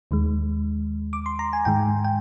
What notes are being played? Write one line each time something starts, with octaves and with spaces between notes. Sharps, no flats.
D#2 D#3 G#3
D6
C6
A#5
G#5
G#2 D#3 G#3 G5
G5